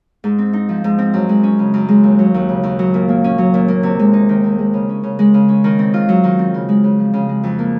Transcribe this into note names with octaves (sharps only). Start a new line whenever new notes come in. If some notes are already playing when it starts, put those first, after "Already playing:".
G#2
C4
D#4
F3
G#2
C4
F#2
G#3
C#4
C#3
F#2
G#3
D#2
F#3
D#2
C#3
D#2
F#3
A#2
A#3
C#4
F#3
A#2
A#3
C3
G#3
D#4
D#3
C3
G#3
C#3
C#4
C#3
G#3
C#3
C#4
D#3
C4
F4
F#3
D#3
C4
C#3
G#3
C#3
F3
C#3
G#3
F2
A#3